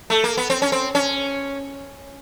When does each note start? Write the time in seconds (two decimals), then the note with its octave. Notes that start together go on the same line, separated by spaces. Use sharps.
0.10 A3
0.24 A#3
0.37 B3
0.50 C4
0.62 C#4
0.72 C4
0.95 C#4